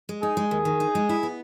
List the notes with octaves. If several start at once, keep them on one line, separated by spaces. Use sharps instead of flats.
G#3
D#4 G#4
G#3
D#2
D#3
D#4
G#3
E4
B3